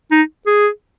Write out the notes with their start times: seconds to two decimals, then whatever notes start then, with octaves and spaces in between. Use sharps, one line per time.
0.11 D#4
0.47 G#4